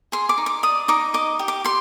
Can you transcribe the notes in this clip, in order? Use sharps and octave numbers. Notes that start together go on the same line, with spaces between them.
G#4 C6
D6
D#4
D6
D5 D#6
D#4 D6
D#5 D6
G4
D6
G4 C6